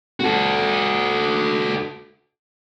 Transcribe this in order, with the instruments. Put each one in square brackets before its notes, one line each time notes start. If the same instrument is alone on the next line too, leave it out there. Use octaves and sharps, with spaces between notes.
[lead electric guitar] F#4 A4